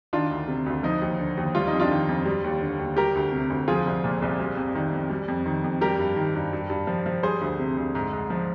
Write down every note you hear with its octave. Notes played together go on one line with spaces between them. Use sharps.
D#3 D4 F4
D2
C3
D2
F3 D#4
D#2
D3
D#2
G3 F4
D#4
F2
D4 F4
D#3
F2
G3
D#2
D3
D#2
G3 G4 A#4
D2
C3
D2
F3 F4 G#4
C2
A#2
C2
G3
F2
D#3
F2
G3
F2
D#3
F2
G3 G4 A#4
G2
D#3
G2
G2
G2
F3
F3
G3 G#4 C5
D2
C3
D2
G#2
G#2
F3